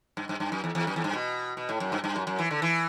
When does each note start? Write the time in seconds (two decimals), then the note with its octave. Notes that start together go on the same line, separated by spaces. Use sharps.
0.17 G2
0.29 G2
0.40 G2
0.52 F#2
0.64 E2
0.75 E2
0.87 F#2
0.96 E2
1.04 G2
1.13 B2
1.57 B2
1.69 A2
1.80 F#2
1.92 G2
2.04 G2
2.16 F#2
2.27 F#2
2.39 E3
2.51 D3
2.62 E3